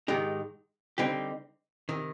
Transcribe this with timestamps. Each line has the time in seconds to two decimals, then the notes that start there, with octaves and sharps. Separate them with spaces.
0.08 G#2 D#3 G#3 D#4 G4
0.98 D3 G3 C4 D#4 G4
1.89 C3 D#3